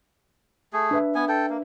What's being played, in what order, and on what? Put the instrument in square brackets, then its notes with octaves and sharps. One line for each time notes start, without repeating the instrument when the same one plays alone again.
[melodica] A3 G#4
[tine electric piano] D4 B4 E5
[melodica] B3 G#5
A4 G5
A#3